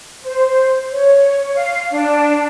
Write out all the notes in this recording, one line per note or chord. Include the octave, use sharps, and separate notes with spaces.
C5
C#5
F5
D4